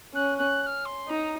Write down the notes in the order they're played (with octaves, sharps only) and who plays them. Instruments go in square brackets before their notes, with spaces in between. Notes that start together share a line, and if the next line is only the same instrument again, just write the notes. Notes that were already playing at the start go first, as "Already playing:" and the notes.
[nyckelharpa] C#4 [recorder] F#6
[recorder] F#6
F#6
F6
C6
[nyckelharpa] D#4 [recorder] A#5